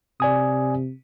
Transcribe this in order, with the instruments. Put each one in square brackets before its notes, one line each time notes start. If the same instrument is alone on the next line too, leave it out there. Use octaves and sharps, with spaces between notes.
[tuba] C3 [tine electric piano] D5 G#5 D#6